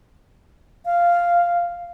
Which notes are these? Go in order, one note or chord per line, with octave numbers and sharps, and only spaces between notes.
F5